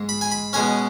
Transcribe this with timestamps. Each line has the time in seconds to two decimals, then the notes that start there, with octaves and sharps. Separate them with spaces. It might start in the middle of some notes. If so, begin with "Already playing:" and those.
Already playing: G#2 G#3
0.09 B5
0.21 G#5
0.32 B5
0.53 B2 G#3 C#4 G#5